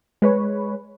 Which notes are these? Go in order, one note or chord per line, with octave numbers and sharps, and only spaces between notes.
G#3 B4 C#5